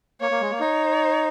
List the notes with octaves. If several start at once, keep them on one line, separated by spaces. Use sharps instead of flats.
A#3 C#5
A#3
G#3
A#3
D#4 C#5